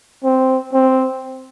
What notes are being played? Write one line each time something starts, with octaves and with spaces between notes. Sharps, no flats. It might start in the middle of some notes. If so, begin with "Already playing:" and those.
C4
C4